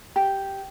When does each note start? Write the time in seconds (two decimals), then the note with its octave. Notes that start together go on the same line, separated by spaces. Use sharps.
0.16 G4